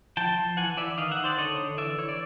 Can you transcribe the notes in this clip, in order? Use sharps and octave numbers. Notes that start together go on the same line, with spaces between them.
F3 G5 A5
F3
E3 F#5 G#5
E3 D5 E5
D#3 D#5 F5
E5 F#5
D#3
C5 D5
D3 C#5 D#5
D3
E3 D5 E5
E3 C#5
D5